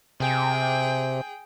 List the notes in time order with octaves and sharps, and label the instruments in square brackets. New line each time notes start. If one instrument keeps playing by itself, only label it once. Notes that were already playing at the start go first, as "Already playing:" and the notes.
[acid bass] C3 [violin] G#4 G5